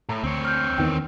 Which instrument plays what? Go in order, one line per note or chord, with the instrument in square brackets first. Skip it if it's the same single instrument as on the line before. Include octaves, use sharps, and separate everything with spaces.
[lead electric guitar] A2 [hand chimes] A#5
[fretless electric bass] D2 [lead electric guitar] C4 C#5
[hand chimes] F6 G6
[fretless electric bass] E2 D#3 B3 [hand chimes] G5